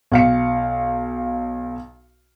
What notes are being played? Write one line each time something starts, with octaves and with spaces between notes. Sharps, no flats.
B1 F5 C#7